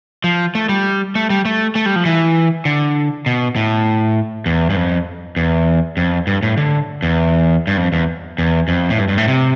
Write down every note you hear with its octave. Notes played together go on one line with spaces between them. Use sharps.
F3
A3
G3
A3
G3
A3
A3
G3
F3
E3
D3
B2
A2
E2
G2
F2
E2
F2
G2
A2
D3
E2
G2
F2
E2
E2
F2
A2
G2
G2
A2
C3